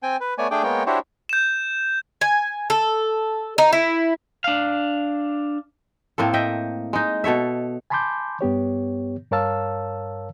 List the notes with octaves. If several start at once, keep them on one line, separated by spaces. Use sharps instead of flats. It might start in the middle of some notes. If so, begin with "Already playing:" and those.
C4 G5 G#5
B4
A3 B3 C#5 D5 G#5
A3 D4 G#4 G5 D6
G#3 A#3 B3 C#5 G5
D4 E4 F#4 G4 C5 C#5
G6 E7
G#5
A4
D#4
E4
D4 F5
A2 A#3 C4 A4
D#5 E5 G5
G#3 D#4
B2 A4 C#5 E5
G#5 A5 B5 C6 D6 G6
G2 B3 G4 C#5
G2 A#4 C#5 F5 A5 E6